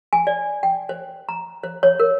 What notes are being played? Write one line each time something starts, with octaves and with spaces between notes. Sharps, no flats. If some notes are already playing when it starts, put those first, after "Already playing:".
G#5
D5
G5
C5
A#5
C5
C#5
A#4